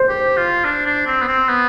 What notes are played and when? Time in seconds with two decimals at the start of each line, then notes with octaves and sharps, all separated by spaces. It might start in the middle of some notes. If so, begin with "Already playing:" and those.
Already playing: C5
0.09 G4
0.37 F4
0.65 D4
0.86 D4
1.07 C4
1.22 B3
1.28 C4
1.49 B3